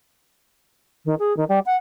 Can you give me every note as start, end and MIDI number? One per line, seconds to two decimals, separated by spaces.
1.05 1.15 51
1.19 1.36 68
1.37 1.45 51
1.49 1.59 55
1.66 1.76 78